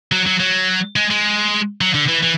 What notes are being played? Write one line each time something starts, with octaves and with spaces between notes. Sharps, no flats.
F#3
F#3
F#3
G#3
G#3
F#3
D3
E3
E3